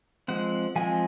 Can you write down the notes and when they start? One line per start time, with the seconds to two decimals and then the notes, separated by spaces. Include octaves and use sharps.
0.28 F3 G#3 C4 F#5
0.76 F3 G#3 C4 G#5